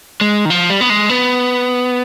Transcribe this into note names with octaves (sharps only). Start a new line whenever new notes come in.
G#3
D#3
F3
G3
B3
G#3
B3